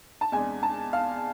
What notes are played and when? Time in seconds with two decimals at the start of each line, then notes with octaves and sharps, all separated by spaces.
0.21 A5
0.32 E2 C3 G#3 D4 G#5
0.63 A5
0.93 F5